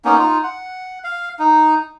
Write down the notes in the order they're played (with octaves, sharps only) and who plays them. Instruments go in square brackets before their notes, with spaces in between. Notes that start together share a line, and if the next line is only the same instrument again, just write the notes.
[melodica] A#3 B3 C#4 D#4
D#4 F4
F#5
F5
D#4